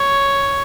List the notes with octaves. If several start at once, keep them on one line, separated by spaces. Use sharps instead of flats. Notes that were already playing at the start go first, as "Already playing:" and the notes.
Already playing: C#5